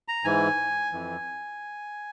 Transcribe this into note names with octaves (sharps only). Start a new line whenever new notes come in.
A#5
G#2 E3 G#5
F2 E3